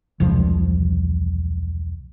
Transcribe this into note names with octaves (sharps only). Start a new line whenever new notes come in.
E1 C2 F3